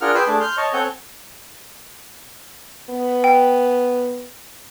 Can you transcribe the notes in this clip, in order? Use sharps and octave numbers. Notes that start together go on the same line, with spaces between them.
D4 F4 G#4 A#4 F#5 F6
G#4 B4 G5 C6 D6 E6
A3 D4 G#4 A5
C6 F6 G6
C#5 D#5 A5 C#6
C4 A4 C#5 F#5 G#5 G6
B3
G5